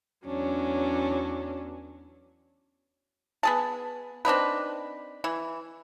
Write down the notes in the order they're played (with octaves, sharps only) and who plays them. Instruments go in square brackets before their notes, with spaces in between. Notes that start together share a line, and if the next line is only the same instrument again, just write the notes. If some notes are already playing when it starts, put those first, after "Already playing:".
[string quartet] E2 F#3 C#4 D4
[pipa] B3 G#4 A5
C4 D4 D#4 B4
E3